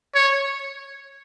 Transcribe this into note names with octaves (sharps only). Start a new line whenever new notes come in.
C#5